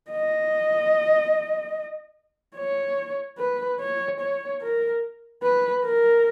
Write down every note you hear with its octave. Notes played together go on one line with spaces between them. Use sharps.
D#5
C#5
B4
C#5
C#5
A#4
B4
A#4